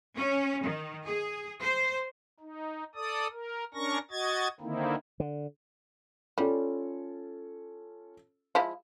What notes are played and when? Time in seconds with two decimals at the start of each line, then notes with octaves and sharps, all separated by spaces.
0.16 C#4
0.64 D#3
1.06 G#4
1.62 C5
2.40 D#4
2.95 A4 D5 D#6
3.32 A#4
3.74 C#4 D4 A#4 C#6 A#6
4.11 F#4 D#5 G#6 A6
4.60 D3 D#3 A#3 C4 D#4 E4
5.20 D3
6.38 G3 C#4 F4 A4
8.55 F3 G#3 E4